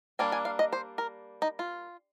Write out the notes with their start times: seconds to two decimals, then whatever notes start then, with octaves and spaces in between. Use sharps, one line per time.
0.19 G3 A#3 D4 G#5
0.32 G#5
0.45 F5
0.59 D#5
0.73 C5
0.98 A#4
1.42 D#4
1.59 F4